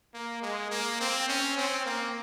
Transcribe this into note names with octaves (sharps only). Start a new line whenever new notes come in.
A#3
G#3
A#3
C4
C#4
C4
A#3